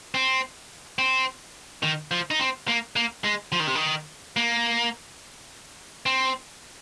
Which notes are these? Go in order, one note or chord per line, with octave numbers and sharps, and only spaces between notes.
C4
C4
D#3
F3
D#4
C4
A#3
A#3
G#3
F3
D#3
C3
D#3
A#3
C4